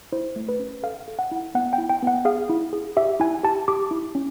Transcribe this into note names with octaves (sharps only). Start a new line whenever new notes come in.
E4 C5
A3
B4
C#4
A4 F5
A4
F#5
E4
B3 F#5
G5
E4
G5
B3 F#5
G#4 F5
E4
G#4
G4 E5
E4 G#5
G4 A5
G4 D6
E4
C#4